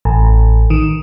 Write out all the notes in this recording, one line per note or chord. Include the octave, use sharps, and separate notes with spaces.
A1
D#3